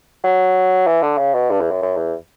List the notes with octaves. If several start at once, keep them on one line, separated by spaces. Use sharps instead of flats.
F#3
E3
D3
C#3
B2
G2
E2
F#2
F#2
E2